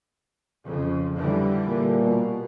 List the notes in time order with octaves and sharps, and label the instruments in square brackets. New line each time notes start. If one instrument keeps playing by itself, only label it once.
[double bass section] F2 C#3
D3 E3 G3
[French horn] A#2
[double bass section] B2